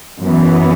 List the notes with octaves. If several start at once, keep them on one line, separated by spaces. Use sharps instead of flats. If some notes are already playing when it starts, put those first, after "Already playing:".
F#2 E3 B3